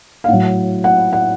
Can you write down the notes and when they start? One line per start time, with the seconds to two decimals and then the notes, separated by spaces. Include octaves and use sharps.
0.24 F5
0.28 A2 F#3 F#5
0.84 F#5
1.13 F#5